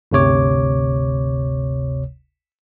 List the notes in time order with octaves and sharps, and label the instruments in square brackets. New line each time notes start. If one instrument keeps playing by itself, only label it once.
[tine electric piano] G1 D2 C3 C#5 D6